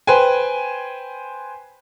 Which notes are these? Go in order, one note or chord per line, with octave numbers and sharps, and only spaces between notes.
B4 C5 G5 G#5